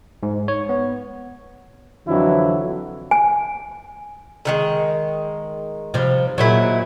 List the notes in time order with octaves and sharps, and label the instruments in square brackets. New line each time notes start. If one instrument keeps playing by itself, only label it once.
[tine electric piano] G#2
C#5
B3
[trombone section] F2 D3 E3 F#3 D4 E4
[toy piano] G#5
[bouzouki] D3 D#3 G#3
[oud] C3 F3 G3
[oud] A#2 F#3 [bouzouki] D#3 G#3 E4